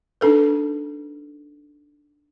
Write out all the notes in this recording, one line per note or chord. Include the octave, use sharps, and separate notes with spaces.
D4 D#4 A4 B4